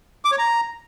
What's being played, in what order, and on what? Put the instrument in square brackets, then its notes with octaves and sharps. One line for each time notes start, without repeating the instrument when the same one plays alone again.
[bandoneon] D6
C#5
A#5